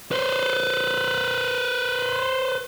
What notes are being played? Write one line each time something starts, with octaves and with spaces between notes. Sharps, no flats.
B4 C5